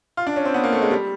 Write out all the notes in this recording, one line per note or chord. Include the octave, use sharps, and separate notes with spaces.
F4
D4
C#4
C4
B3
A#3
A3
G#3
G3